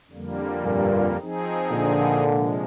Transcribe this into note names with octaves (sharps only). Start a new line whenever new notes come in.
F2 D3 G3 A#3
G2 A#2
F3 C4 D#4 G#4
A#2 D3
C3 F3 G#3